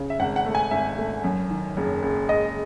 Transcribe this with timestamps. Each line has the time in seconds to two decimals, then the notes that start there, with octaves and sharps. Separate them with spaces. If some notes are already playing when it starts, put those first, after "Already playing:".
Already playing: C#3
0.10 E5
0.19 G#1 F#5
0.36 F#5
0.46 A3
0.55 G#5
0.71 G#1 E5
0.98 A3
1.24 F#2
1.50 D#3
1.77 F#1
2.03 F#1
2.28 G#3 D#5